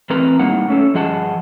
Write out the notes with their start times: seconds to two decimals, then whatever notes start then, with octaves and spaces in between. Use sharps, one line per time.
0.10 E2 A3 C4 A#4 B4 A#5
0.39 A2 G3 A#3 D#4 F#5
0.68 A3 C#4 A4
0.94 G2 F3 G#4 D#5 F#5 A5